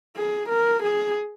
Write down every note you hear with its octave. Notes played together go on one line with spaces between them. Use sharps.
G#4
A#4
G#4